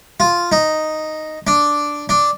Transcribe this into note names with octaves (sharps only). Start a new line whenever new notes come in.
F4
D#4
D4
D4